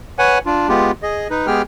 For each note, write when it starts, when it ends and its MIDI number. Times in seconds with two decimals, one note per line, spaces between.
0.19 0.38 71
0.19 0.38 73
0.19 0.38 78
0.19 0.38 80
0.46 0.68 62
0.46 0.68 65
0.69 0.91 56
0.69 0.91 59
0.69 0.91 65
0.69 0.91 67
1.03 1.28 68
1.03 1.28 75
1.30 1.47 63
1.30 1.47 71
1.47 1.62 56
1.47 1.62 59
1.47 1.62 67
1.47 1.62 68
1.47 1.62 79
1.47 1.62 89